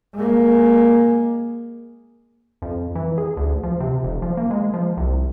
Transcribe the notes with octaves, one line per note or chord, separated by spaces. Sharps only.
G#3 A#3
F2
E3
G#4
D2
F3
C3
F1
F3
A#3
G#3
F3
C2